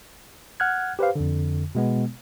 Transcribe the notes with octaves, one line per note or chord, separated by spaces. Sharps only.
F#5 F6 F#6 G#6
G4 B4 C5 F5
F2 D3
B2 G#3 B3